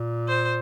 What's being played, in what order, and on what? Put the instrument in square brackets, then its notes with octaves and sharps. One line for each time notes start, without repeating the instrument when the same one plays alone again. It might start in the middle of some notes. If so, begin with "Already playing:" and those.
Already playing: [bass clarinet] A#2
[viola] C5